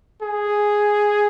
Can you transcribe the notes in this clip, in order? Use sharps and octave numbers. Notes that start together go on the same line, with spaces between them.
G#4